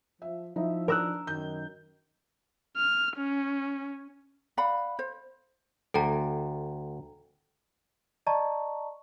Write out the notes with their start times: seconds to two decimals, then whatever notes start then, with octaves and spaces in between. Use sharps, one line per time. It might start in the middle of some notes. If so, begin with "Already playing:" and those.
0.22 F3 E5
0.56 F3 D#4 E4 E5
0.88 D4 A#4 E6 F#6
1.27 F#2 D#3 G6
2.77 F6
3.17 C#4
4.57 D5 F5 F#5 B5
4.99 C5
5.94 D2 A4 G5 A#5
8.27 D5 D#5 A5 A#5 C#6